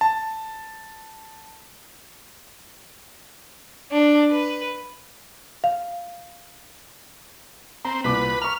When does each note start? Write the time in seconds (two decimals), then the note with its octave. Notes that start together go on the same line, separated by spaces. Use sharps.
0.01 A5
3.91 D4
4.31 B4
5.64 F5
7.85 C4 A#5
8.04 C2 A#2 B4 D6
8.42 A#5 C#6 F6